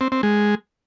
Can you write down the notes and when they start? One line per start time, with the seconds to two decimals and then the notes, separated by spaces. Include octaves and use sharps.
0.01 C4
0.12 C4
0.23 G#3